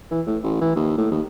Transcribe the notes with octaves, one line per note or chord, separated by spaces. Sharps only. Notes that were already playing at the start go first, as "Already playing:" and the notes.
E3
A2
A1
E3
D#2
A2
D#2